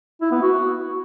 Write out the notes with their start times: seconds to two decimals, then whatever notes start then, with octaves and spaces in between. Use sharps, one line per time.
0.21 E4
0.32 B3
0.42 F#4